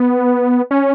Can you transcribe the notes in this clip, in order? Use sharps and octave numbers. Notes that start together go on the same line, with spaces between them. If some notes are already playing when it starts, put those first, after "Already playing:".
Already playing: B3
C#4